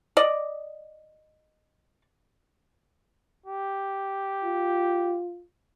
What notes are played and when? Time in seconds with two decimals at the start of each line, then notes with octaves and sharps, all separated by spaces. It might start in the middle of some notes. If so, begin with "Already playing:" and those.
0.17 D5 D#5
3.46 G4
4.44 F4